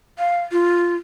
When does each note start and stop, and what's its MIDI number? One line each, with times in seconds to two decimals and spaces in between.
0.19 0.42 77
0.52 0.95 65